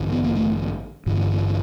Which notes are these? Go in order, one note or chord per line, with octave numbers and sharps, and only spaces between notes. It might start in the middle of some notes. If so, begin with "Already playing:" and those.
Already playing: A1 G2 D3
B3
A#3
A3
A1 G2 D3